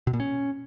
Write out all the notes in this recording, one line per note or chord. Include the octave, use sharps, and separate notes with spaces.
B2
A#2
C#4